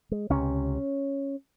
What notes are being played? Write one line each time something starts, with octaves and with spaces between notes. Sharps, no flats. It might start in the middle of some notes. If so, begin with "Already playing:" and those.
G#3
C#2 C3 C#4